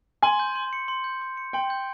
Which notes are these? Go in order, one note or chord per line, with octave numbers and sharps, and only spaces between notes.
G#5 C6
G6
C6
C#7
C6
G6
C6
C#7
G5 C6
G6